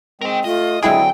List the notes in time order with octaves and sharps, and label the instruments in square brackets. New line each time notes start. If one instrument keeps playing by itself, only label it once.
[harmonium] G#3 C4 [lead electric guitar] A#4 G5
[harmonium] A3 [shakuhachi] F4 [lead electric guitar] D#5
[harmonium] D3 F#3 C4 [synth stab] G#3 E4 G#4 [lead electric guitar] G5 [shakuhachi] G#5